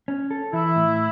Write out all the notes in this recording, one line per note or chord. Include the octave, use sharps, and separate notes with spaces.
C#4
A4
E3 E4
A2